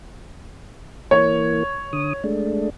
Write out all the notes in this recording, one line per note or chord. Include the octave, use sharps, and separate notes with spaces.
E3 A#3 C#5
D3 D#6
G#3 A3 D4